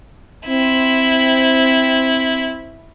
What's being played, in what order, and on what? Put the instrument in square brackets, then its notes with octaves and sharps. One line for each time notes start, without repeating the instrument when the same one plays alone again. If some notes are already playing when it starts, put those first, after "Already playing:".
[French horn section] C4 [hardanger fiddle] E4